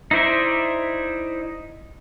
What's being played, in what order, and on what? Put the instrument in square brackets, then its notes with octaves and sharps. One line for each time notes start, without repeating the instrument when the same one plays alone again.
[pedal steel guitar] D#4 E4 C5 D5 E5